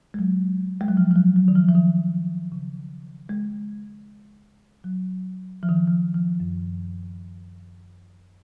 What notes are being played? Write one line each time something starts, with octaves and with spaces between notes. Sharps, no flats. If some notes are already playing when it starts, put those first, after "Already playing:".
G#3
F#3
G#3
F#3
F3
F3
F#3
F#3
D#3
F3
F3
D#3
C#3
G#3
F#3
F3
D#3
F3
F3
F3
F#2